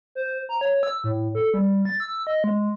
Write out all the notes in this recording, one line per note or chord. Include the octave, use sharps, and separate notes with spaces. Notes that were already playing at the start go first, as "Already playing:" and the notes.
C5
A#5
C#5
E6
A2
A4
G3
A6
E6
D#5
G#3